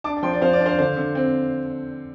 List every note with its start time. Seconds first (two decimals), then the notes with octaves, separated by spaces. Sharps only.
0.04 D4 A5 D6
0.17 A5
0.23 F3 G5 C6
0.33 D5
0.42 F3 C5 F5
0.53 D5
0.61 D4
0.66 C5 F5
0.79 D3 C5 F5
0.97 D3
1.15 C4